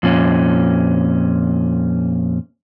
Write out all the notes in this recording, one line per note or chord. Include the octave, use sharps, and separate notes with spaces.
F2 A#2 C#4